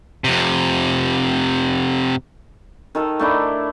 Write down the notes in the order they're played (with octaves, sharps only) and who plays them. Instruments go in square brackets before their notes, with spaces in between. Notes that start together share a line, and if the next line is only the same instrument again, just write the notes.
[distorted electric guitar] F2 C3
[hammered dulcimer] D#3 A4 A#4
A3 D4 E4